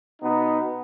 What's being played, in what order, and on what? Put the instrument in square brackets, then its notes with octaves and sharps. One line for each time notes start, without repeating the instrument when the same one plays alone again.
[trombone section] B2 B3 D#4